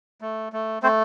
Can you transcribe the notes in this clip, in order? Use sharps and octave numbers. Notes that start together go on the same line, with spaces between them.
A3
A3
A3 C4 C5